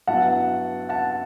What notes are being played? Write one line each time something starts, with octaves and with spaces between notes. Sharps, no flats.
G2 F#3 B3 E4 F#5 A5
F#5 A5